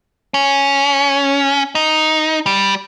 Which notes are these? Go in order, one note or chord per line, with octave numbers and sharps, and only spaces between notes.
C#4
D#4
G3